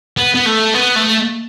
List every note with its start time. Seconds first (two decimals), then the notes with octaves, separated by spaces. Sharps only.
0.17 B3
0.35 B3
0.46 A3
0.74 B3
0.96 A3